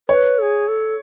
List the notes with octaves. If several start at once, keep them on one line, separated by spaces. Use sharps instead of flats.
B4 C#5
A4
G#4
A4